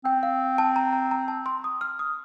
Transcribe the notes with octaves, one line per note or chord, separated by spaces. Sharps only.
C4 G5
F5
A5
A#5
A#5
A#5
A5
C6
D#6
F6
D#6